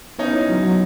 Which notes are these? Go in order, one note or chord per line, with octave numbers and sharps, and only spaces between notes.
B3 C#4 D#4
E4
F#3
F#3